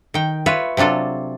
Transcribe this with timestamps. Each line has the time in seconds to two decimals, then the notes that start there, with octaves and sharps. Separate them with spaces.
0.14 D#3 G5
0.46 F4 B4 C#5 E5
0.77 C3 F#3 D4 F4 A4